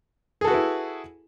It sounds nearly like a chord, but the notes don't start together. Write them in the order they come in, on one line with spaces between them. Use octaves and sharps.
G#4 A4 F#4 B4 E4